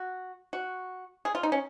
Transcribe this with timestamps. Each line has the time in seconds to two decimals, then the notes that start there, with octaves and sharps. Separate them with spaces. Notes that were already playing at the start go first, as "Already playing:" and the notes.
Already playing: F#4
0.53 F#4
1.25 G#4
1.35 F4
1.43 D#4
1.52 C#4